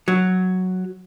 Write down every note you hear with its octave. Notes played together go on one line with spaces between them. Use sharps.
F#3